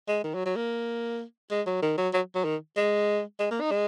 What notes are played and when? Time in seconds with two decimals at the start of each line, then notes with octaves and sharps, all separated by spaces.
0.09 G#3
0.24 D#3
0.35 F#3
0.46 F#3
0.56 A#3
1.51 G#3
1.67 F#3
1.82 D#3
1.98 F#3
2.14 F#3
2.35 F#3
2.45 D#3
2.77 G#3
3.40 G#3
3.51 A#3
3.61 D#4
3.72 G#3